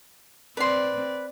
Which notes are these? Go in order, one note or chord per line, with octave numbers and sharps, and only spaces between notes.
C4 B4 D5 C6